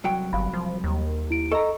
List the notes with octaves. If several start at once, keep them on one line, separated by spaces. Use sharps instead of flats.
C2 F#3 G5
G1 F5 B5
F3
D#2
E4 D7
A4 D#5 A#5 C#6